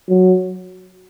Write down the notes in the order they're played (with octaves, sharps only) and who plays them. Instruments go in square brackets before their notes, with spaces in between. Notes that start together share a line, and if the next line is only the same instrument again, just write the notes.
[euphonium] F#3